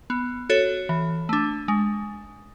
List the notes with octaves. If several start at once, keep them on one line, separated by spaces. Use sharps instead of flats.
B3
F#4 A4 C#5
E3
A3 D4
G#3